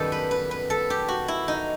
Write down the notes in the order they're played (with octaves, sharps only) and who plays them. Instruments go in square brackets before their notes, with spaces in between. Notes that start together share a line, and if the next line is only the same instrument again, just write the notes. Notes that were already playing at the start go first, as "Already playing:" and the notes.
Already playing: [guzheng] F#2 D#3 G3 B3 G4 A4
B4
B4
B4
A4
G4
F#4
E4
D#4